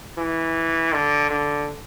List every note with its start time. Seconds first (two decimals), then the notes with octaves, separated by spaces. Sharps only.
0.18 E3
0.93 D3
1.30 D3